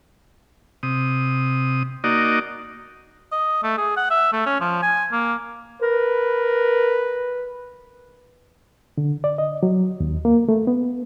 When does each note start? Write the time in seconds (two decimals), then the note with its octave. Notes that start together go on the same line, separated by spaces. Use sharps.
0.83 C3 D#6
2.04 A#3 D#4 F#4 D5 D#5
3.32 D#5
3.63 A3
3.78 G#4
3.97 F#5
4.10 E5
4.33 A3
4.46 C#4
4.61 F3
4.83 G#5
5.12 A#3
5.82 A#4 B4
8.98 D3
9.24 D5
9.38 D#5
9.63 F#3
10.00 D#2
10.25 A#3
10.49 A3
10.67 B3